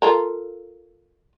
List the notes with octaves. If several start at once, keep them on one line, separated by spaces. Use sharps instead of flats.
F4 A4 A#4